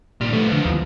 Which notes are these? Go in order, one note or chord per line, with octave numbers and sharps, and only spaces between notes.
A#2 D#3 G3
F3 A3 B3
D3
D#2